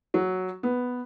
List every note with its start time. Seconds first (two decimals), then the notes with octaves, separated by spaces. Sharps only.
0.14 F#3
0.63 B3